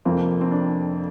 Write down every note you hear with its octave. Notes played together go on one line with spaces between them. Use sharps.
F1 F2 F3 A#3 C4
C4
D4